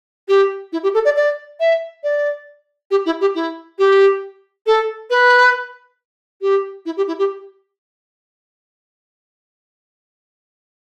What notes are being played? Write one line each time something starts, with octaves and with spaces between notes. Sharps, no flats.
G4
E4
G4
A4
D5
D5
E5
D5
G4
E4
G4
E4
G4
A4
B4
G4
E4
G4
E4
G4